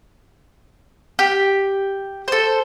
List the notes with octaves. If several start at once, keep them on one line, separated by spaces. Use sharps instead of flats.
G4
A4 C5